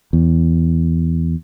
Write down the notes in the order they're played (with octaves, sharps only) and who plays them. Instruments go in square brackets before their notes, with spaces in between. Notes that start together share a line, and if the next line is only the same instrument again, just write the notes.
[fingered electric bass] E2